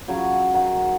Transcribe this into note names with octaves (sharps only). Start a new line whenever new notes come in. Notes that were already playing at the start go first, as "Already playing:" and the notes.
C#3 F#3 F5
D#3 F#5